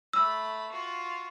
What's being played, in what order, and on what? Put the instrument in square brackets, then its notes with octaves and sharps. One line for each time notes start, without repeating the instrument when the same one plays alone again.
[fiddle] A3 B5 [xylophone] E6
[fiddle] F4 F#4